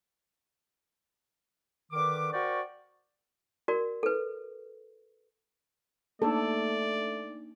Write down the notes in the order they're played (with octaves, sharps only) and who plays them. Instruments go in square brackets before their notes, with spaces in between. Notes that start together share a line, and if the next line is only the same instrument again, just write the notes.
[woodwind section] D3 D#3 B4 D6
F#4 A#4 C5 D5 G5 C#6
[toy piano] F#4 A#4 D5
A4 B4
[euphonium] A3 [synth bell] A#3 D4 D#4 [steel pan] A4 [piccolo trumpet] D5